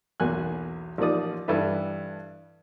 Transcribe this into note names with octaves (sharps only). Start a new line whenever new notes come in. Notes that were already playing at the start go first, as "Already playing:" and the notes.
B1 E2 A#3 G#5 F#6
A1 F3 A#3 D#4 D5 D#6
G2 E3 A4 B4 E5